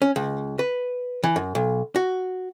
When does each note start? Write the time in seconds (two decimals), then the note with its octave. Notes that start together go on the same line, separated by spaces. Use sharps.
0.02 C#4
0.16 C#2
0.59 B4
1.24 E3
1.36 F#2
1.55 B1
1.96 F#4